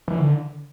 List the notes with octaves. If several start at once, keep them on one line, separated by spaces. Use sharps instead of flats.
E3
D3